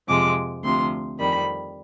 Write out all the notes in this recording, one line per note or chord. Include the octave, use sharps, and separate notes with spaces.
F2 C3 F3 G#3 D6
D2 C3 F3 C6
F2 D#3 G3 B5